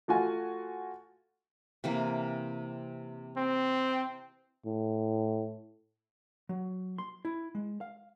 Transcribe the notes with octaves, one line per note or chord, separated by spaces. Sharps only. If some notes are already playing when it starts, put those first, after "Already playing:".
A3 F4 F#4 G#5
C3 E3 A#3
C4
A2
F#3
C6
E4
G#3
F5